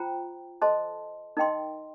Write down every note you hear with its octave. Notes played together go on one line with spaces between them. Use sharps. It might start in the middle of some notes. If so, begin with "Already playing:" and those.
Already playing: F4 C5 G5 A#5
A4 C5 D#5 A5 C6
D#4 A#4 D#5 G5 C6